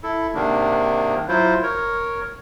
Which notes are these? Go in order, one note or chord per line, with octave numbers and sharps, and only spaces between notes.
E4 A4
G#2 C3 D#3 A#3 D4
F#3 E4 F4 C5
A#4 C#5